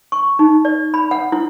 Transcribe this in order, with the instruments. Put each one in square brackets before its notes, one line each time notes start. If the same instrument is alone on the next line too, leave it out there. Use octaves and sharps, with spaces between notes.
[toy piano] C#6
D#4
D5
B5
F#5
E4